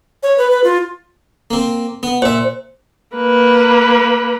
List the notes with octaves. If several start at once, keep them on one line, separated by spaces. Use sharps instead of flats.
C#5
B4
B4
F4
A#3 C4
B3
A#2 C5 E5
A#3 B4